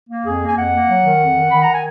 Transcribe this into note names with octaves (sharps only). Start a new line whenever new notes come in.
A#3
F2 G#4
A#3
G#5
F2 F#5
A#3
F#3
D#3
F2
D#3
D#3 B5
A#5
D#3 G#5